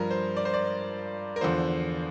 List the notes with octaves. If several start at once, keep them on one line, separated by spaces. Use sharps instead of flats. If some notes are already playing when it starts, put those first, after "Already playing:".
Already playing: G2 F3 A#4
C5
D5
C5
D5
A#4
E2 D3 F3 C5